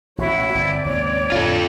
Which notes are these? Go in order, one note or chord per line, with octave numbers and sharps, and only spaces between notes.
A1 B2 E4 F#4 C#5
G1 C4 D5
D#2 G#2 C#3 C#5
F2 A2 D3 F4 A4